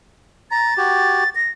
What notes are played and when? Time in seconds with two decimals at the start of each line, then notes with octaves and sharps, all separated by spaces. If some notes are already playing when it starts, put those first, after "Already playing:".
0.51 A#5 A6
0.77 F#4 G4
1.35 A#6